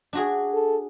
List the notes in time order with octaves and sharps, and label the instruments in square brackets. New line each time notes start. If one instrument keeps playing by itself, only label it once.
[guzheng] D4 F#4 G#4
[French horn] A4